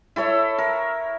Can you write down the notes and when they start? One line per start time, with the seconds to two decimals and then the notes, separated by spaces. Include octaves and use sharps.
0.16 E4 A4 C#5 E5
0.58 A#4